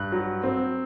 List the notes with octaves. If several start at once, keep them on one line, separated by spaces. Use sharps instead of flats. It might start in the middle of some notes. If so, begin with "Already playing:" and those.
Already playing: G2 F#6
F#3
C4